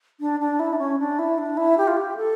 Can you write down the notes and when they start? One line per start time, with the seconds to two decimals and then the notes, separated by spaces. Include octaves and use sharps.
0.20 D4
0.40 D4
0.59 E4
0.72 D4
0.78 C#4
0.99 D4
1.18 E4
1.38 D4
1.57 E4
1.77 G4
1.87 F4
1.97 G4
2.16 A4